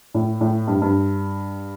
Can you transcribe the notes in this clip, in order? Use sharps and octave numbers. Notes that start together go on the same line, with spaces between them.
A2
A2
G2
G2